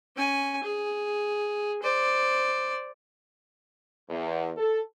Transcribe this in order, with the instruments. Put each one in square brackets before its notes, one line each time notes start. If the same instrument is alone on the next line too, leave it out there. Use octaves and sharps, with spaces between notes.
[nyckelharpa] C#4 G#5
G#4
C5 D5
[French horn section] E2
A4